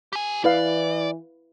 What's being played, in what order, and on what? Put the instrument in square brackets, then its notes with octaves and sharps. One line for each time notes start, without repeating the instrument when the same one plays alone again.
[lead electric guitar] G4 G#5
[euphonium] E3 [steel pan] E4 B4 F5 [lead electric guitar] D5